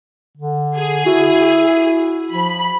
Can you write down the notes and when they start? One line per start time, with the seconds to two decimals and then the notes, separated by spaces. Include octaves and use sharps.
0.37 D3
0.75 G#4
1.06 E4 F#4
2.32 F3 B5